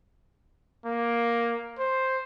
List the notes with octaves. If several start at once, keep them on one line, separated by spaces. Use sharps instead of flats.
A#3
C5